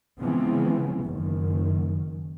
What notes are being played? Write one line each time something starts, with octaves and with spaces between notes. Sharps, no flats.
C#3 E3 F3 G#3 B3 C4
F#1 F#2 D#3